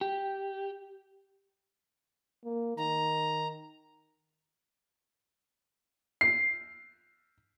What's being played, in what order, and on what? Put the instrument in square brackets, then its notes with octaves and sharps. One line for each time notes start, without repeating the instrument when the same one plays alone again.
[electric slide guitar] G4
[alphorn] A#3
[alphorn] D#3 [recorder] A#5
[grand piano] C7